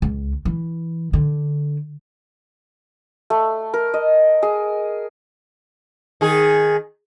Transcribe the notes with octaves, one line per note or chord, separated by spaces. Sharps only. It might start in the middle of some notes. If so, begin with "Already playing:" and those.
C#2
E3
D3
A3
A#4
D#5
G#4
D#3 G#4